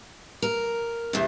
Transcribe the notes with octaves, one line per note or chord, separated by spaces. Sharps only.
A#4
E2 C3